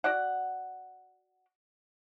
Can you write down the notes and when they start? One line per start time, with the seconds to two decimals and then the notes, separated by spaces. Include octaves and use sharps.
0.04 F#4 D5 F#5